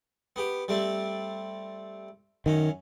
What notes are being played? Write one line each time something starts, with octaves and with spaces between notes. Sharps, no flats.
B3 G4
G3 A3 C4
F#2 D#3 C#4